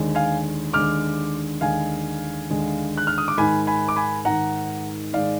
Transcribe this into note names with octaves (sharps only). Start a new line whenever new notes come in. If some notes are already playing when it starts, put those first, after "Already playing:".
Already playing: D#2 D3 G#3
F5 G#5
D#2 D3 G#3 D6 F6
D#2 D3 G#3 F5 G#5
D#2 D3 G#3
F#6
F6
D#6
D6
G#2 D#3 G#3 G#5 B5
G#5 B5
D6
G#5 B5
G#2 D#3 G#3 F#5 A#5
G#2 D#3 G#3 D5 F5